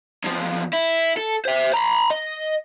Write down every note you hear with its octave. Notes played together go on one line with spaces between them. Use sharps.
E2 F3
E4
A4
C5 E5
A#5 B5
D#5